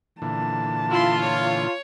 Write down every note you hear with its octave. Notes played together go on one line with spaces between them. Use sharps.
A#2 D3 E3 A5
E4 F4 C6
C#5